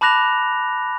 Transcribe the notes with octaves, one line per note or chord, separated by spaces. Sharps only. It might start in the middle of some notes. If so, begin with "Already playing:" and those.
A5 B5 D6 F#6 A#6 F7